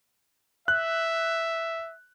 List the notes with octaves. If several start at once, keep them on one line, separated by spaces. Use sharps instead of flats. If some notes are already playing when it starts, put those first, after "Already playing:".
E5 F#6